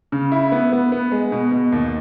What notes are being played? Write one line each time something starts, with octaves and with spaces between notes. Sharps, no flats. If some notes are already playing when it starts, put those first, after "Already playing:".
C#3
E4
B3
B3
B3
G#3
B2
B2
D#2